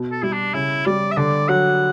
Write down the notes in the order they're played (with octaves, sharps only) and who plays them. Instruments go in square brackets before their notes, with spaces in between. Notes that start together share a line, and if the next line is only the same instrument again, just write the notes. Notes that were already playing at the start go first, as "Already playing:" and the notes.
Already playing: [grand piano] B2
[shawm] A4
[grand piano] G3 [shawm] E4
[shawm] D4
[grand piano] C#3 [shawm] E4
[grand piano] G3 [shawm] D5
[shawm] E5
[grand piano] D3 [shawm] D5
[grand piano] F#3 [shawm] F#5